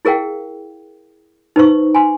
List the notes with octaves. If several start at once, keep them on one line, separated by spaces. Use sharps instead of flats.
E4 G#4 A#4 F5 G5
D#4 B4 C5 C#6
G#5 C6